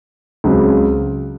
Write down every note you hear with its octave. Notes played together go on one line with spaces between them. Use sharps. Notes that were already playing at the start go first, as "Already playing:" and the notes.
C#2 C#3 F#3 C4